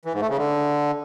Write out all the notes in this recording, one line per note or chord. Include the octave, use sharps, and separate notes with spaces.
E3
G#2
A3
C#3
D3